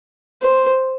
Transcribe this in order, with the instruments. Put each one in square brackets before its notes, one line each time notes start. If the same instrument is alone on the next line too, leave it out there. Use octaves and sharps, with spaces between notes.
[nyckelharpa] C5